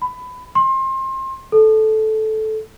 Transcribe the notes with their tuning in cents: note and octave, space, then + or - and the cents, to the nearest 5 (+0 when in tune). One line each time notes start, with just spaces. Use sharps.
B5 +20
C6 +30
A4 -10